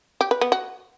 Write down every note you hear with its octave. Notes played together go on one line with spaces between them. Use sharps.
G4
B4
B3
F#4